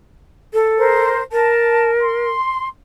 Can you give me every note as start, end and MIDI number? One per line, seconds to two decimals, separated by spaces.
0.54 1.06 69
0.78 1.22 70
0.78 1.22 72
1.32 2.28 70
1.32 1.90 81
2.01 2.68 84